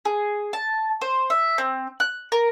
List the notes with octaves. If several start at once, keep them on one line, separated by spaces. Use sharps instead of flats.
G#4
A5
C5
E5
C4
F#6
A#4